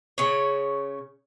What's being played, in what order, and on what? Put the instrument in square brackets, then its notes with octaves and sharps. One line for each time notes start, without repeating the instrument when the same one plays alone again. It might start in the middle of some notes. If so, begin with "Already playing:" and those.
[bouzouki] C#3 C#5